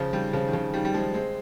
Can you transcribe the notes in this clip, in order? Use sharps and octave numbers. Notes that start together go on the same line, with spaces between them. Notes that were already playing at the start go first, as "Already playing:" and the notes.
Already playing: C#3 F3
D#3 G3
C#3 F3
D#3
C#3 F3
D#3 G3
G3
F3 G#3
G#3 C4